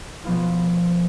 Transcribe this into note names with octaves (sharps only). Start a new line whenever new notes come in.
B2 F3 B3 F4